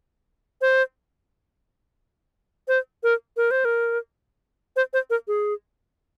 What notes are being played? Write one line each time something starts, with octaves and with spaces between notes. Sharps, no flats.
C5
C5
A#4
A#4
C5
A#4
C5
C5
A#4
G#4